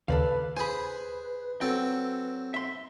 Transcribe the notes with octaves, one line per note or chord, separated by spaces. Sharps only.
D#2 C#3 A4 B4 D5 F5
G#4 B4 C5 G#5 B5
F#3 C4 A4 G5
E5 C6